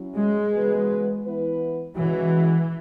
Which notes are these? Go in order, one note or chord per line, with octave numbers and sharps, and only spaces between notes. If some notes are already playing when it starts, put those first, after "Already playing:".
Already playing: F#3 C#4 E4
G#3
C#3 E3 B3 F#4 B4
E3 B3 E4 B4
C#3 E3 G#3 C#4 F#4